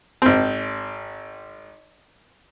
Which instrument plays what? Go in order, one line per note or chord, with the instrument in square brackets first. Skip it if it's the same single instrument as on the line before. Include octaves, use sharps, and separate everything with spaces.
[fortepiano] G#1 C4